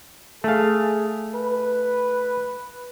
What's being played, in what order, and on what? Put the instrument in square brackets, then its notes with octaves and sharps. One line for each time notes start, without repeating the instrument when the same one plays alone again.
[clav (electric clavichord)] A3 F5 [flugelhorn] G#4
[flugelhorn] B4